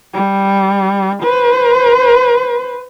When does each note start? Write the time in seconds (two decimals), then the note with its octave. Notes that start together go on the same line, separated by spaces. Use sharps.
0.14 G3
1.23 B4 C5